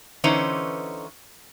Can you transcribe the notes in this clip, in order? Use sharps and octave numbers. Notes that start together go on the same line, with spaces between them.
D3 E3 C#4 D#4 B4 C5